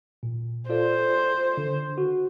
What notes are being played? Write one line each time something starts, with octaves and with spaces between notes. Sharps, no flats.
A#2
F4 A4 C5 D5
D3
F#4